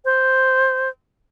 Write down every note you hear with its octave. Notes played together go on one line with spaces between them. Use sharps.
C5